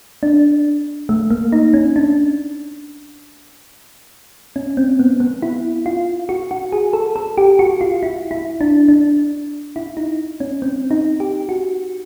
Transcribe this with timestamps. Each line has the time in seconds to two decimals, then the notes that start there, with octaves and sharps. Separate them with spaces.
0.23 D4
1.09 A3
1.30 A#3
1.52 D#4
1.74 C#4
1.96 D4
4.56 C#4
4.77 C4
4.99 B3
5.20 B3
5.42 E4
5.86 F4
6.29 F#4
6.51 F#4
6.72 G#4
6.93 A4
7.16 A4
7.38 G4
7.59 F#4
7.81 F4
8.03 E4
8.31 E4
8.61 D4
8.88 D4
9.76 E4
9.97 D#4
10.40 C#4
10.62 C4
10.91 D#4
11.20 G4
11.49 F#4